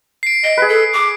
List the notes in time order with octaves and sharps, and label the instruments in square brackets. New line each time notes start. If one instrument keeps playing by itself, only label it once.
[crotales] C7 D7
[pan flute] D#5 [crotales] D7
[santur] G#4 B4
[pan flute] A4
D6